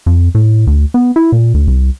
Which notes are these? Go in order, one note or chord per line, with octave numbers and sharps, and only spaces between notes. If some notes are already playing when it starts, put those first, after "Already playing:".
F2
A2
D2
B3
E4
A#2
D2
C2